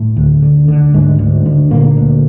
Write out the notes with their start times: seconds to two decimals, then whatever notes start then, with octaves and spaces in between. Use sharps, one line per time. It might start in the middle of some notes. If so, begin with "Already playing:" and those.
Already playing: A2 A3
0.17 D2
0.43 D3
0.68 D3
0.93 D2 G#2 G#3
1.19 D2
1.46 D3
1.71 A#2 D3 A#3
1.97 D2